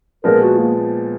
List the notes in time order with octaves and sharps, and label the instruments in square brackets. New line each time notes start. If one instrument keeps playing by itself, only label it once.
[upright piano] A#2 F3 G#3 B3 [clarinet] A#4
[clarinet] F#4
A#3